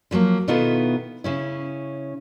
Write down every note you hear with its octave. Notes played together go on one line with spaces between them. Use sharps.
D3 F3 F#3 A#3
B2 D#3 B3 E4 F4 A4
C#3 C#4 E4